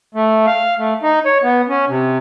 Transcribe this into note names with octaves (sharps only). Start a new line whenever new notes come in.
A3
F5
A3
D#4
C#5
B3
C#4
C3